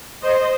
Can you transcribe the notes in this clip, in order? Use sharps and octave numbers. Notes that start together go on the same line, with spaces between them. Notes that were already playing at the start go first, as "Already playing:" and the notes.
C5 D#5